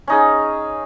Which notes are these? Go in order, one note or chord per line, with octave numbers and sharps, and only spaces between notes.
C#4 D#4 G#4